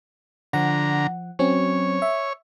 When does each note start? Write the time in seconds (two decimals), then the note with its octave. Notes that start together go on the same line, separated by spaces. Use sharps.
0.53 D3 F3 F#5 A#5
1.39 F#3 C4 C#4 C#5
2.02 E5